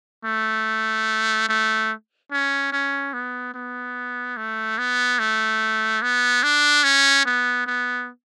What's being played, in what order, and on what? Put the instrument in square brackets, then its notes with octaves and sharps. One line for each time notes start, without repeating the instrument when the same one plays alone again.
[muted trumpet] A3
A3
C#4
C#4
B3
B3
A3
B3
A3
B3
D4
C#4
B3
B3